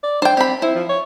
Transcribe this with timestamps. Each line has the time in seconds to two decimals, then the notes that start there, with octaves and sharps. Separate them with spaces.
0.03 D5
0.22 D4 C5 G5
0.37 C4 G4 B5
0.62 E4 C5
0.75 F3
0.89 C#5